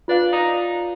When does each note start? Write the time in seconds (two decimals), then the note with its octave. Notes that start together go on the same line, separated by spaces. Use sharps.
0.08 D4 F4 B4 D5 F5
0.32 D#4